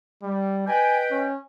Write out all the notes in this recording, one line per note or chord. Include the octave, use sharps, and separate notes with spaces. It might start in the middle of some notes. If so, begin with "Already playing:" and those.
G3
B4 D#5 G5 G#5
C#4